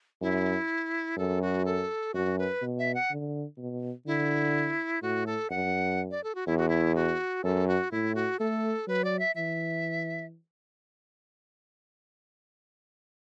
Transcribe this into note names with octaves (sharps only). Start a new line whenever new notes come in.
F#2 E4
F#2 A4
F#4
A4
F#2 F#4
B4
B2
E5
F#5
D3
B2
D3 E4
A2 F#4
A4
F#2 F#5
D5
A4
F#4
E2 E4
F#4
E4
F#4
F#2 A4
F#4
A2 E4
F#4
A3 A4
F#3 B4
D5
E5
E3 E5